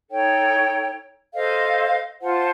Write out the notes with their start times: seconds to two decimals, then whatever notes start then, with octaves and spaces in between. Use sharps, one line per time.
0.11 D#4 A4 C#5 G5
1.34 A4 C5 D#5 F5
2.22 F4 C5 F#5 A5